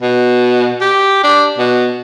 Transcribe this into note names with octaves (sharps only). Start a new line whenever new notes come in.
B2
G4
D4
B2